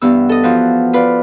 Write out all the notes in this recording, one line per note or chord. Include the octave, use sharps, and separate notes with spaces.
G2 E3 B3 E6
A4 D#5
E3 F3 F#4 B4
F4 B4 D5